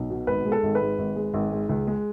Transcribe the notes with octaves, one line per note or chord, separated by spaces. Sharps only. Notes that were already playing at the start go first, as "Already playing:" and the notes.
Already playing: B1
B2
G#1 B4
G#3
A4
G#1
B4
G#2
G#1
G#3
G#1
G#2
C#2
G#3